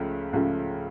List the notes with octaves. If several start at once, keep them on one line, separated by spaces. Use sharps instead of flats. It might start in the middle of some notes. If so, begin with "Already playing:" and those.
Already playing: C#2 C#3 F3 A3
C#2 C#3 F3 A3